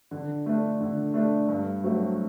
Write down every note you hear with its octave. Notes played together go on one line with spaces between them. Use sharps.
D3
A3 D4
D3
A3 D4
G2
F#3 A3 C4 F#4